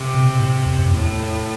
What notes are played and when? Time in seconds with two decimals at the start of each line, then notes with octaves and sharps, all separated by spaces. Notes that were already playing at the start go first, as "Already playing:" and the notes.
Already playing: C3
0.14 B2
0.40 A2
0.66 E2
0.78 F#2
0.91 E2 A2